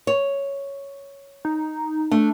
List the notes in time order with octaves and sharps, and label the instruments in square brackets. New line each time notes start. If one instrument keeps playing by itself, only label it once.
[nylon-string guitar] C#5
[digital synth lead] D#4
[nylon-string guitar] A3 [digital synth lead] D4